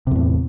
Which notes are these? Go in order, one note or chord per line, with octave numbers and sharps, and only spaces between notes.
E2 A2 C3